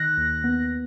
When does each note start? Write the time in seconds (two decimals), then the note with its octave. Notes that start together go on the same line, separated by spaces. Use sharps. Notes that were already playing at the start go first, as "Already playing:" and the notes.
Already playing: D#3 F#6 A#6
0.17 D#2
0.44 B3